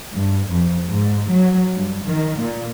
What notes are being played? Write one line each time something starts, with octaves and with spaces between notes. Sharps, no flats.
G2
F2
G#2
F#3
G2
D#3
A#2